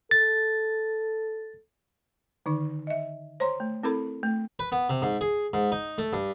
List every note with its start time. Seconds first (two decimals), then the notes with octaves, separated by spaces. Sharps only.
0.11 A4 A6
2.46 D3 D#3 D#4
2.87 D#5 E5
3.40 C5 C#5 A#5 C6
3.60 A3
3.83 C4 E4 A4 A#4 B5
4.23 A3 G5
4.59 B4
4.72 B3
4.90 C3
5.02 G#2
5.21 G#4
5.53 G#2
5.72 D#4
5.98 A3
6.13 G2